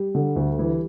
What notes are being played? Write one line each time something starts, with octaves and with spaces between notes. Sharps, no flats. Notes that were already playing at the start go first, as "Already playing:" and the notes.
Already playing: G3
D3
D2
E3